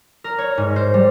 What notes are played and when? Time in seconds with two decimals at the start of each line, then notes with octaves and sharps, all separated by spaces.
0.24 A#4
0.38 C#5
0.58 G#2
0.76 C5
0.94 G3